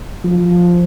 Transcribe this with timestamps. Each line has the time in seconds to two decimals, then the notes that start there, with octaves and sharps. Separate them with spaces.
0.25 F3